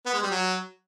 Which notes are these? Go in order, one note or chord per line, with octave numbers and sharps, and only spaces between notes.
B3
G#3
G3
F#3